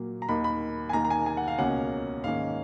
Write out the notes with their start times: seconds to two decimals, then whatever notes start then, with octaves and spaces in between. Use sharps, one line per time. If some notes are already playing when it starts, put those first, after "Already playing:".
Already playing: A#2 F#3 A#3
0.22 A#5
0.28 D#2 D#3 A#3 D#4 B5
0.44 B5
0.89 G#5
0.93 D#2 D#3 A#3 D#4 A#5
1.05 A#5
1.10 G#5
1.26 G#5
1.37 F#5
1.48 F5
1.58 C#2 B2 A#3 C#4 F#5
2.24 G#2 D#3 A#3 C#4 F5